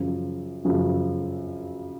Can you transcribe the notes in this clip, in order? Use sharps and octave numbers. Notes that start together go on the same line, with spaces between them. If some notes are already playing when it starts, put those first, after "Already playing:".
Already playing: F#2 C#3 F3
F#2 C#3 F3